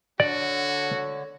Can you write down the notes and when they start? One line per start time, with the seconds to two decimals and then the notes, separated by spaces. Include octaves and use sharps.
0.20 D3 F#4 C#5 D5